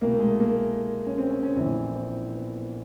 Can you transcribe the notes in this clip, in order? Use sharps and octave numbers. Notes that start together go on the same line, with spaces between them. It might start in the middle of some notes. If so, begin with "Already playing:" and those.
C2 B2 A#3
A3
G#3
A3
A#3
C#4
C4
C#4
C#4
A#1 A2 E3 C4
C4
B3